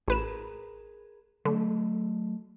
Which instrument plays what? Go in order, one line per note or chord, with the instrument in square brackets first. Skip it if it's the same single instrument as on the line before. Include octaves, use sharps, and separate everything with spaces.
[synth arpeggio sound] A1 B4 E7 [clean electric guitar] G#4 A#4
[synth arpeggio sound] D3 [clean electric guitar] F#3 A3